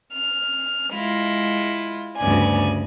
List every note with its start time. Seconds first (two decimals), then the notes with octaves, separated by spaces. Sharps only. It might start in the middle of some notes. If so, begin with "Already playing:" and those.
0.14 F6
0.92 G#3 E4 F4
2.19 D2 G2 C#3 B3 D5 G#5